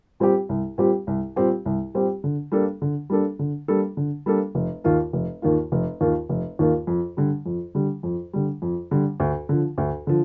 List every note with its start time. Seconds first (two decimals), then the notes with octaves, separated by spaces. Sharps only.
0.20 A#2 G3 C4 G4
0.49 C2
0.78 A#2 G3 C4 G4
1.07 C2
1.36 A#2 G3 C4 G4
1.66 C2
1.94 A#2 G3 C4 G4
2.24 D3
2.52 G3 A#3 D4 A4
2.82 D3
3.10 G3 A#3 D4 A4
3.39 D3
3.68 G3 A#3 D4 A4
3.97 D3
4.26 G3 A#3 D4 A4
4.55 F1
4.84 D#2 D#3 A#3 F4
5.13 F1
5.42 D#2 D#3 A#3 F4
5.72 F1
6.01 D#2 D#3 A#3 F4
6.29 F1
6.59 D#2 D#3 A#3 F4
6.87 F2
7.17 D3 G3
7.46 F2
7.75 D3 G3
8.03 F2
8.33 D3 G3
8.62 F2
8.91 D3 G3
9.20 D2
9.49 D3 F3
9.78 D2
10.07 D3 F3